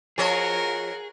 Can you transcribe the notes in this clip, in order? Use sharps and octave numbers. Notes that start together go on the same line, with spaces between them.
F3 F#4 G#4 A#4 C#5 D#5